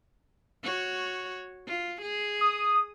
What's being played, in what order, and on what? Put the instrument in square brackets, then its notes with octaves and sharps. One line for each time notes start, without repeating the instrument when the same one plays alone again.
[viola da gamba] F#4 C#5
F4
G#4
[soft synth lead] D#6